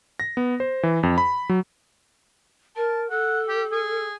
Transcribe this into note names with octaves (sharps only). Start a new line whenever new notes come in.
A#6
B3
C5
E3
F2
B5
F#3
A#4 A5
A4 F#5
G4
G#4